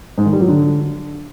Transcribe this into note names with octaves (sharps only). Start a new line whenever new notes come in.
G#2
D#3
G3
F#3
D3